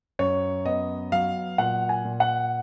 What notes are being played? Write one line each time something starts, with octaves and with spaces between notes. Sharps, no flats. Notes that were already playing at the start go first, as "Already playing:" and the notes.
F#2 C#5
B3 D#5
F#3 F5
A#2 F#5
G#5
A#2
F#5